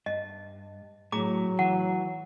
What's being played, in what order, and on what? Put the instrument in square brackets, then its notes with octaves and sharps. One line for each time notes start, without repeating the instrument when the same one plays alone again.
[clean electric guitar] G2 [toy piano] D#5
[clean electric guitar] A2 [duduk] F#3 [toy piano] G#4 A#5 D6
[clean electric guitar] E3 [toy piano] F#5